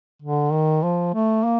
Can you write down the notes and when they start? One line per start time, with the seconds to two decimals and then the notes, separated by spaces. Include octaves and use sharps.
0.22 D3
0.53 D#3
0.83 F3
1.14 A3
1.44 A#3